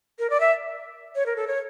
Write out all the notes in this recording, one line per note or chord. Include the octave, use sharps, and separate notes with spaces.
A#4
D5
E5
C#5
A#4
A4
C#5